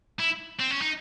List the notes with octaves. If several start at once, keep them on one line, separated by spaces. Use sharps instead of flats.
E4
C4
C#4
D#4